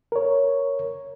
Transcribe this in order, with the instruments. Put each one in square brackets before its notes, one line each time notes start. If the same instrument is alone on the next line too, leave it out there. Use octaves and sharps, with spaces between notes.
[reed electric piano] A#4 C#5